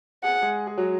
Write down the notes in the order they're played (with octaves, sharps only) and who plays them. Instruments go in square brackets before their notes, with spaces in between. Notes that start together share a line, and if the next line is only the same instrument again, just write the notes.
[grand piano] G#4 [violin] F#5
[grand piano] G#3 G#4
G#4
F#3 F#4